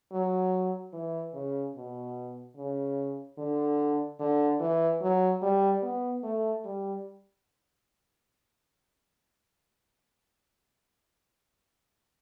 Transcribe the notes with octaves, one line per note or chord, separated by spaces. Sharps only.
F#3
E3
C#3
B2
C#3
D3
D3
E3
F#3
G3
B3
A3
G3